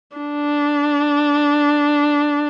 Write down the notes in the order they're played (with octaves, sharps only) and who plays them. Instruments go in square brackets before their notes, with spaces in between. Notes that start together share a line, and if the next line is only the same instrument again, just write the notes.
[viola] D4